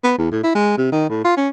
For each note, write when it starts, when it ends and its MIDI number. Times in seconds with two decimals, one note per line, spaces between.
0.04 0.13 59
0.18 0.31 40
0.32 0.43 45
0.44 0.52 64
0.55 0.75 56
0.78 0.87 48
0.92 1.06 51
1.09 1.24 45
1.25 1.36 65
1.37 1.49 61